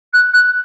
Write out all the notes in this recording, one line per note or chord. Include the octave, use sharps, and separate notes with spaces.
F#6
F#6